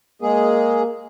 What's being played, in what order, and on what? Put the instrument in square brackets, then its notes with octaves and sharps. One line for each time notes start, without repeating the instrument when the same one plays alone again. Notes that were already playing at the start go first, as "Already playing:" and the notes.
[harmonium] G#3 G#4 [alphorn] A#3